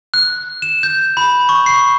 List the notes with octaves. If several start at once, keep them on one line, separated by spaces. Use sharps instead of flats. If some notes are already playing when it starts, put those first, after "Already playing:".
F#6
E7
G6
B5
C#6
C7